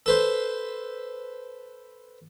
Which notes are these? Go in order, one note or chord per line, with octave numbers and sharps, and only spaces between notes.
A4 B4 C5